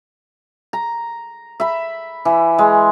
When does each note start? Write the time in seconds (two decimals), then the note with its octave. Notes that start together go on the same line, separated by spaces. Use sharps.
0.73 A#5
1.60 E5 B5
2.25 E3
2.59 G#3